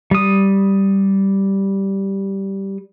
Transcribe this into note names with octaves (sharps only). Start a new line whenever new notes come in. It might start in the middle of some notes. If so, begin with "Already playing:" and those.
G3 D#6